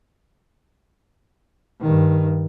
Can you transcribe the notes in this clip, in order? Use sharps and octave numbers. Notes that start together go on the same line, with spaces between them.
G2 D#3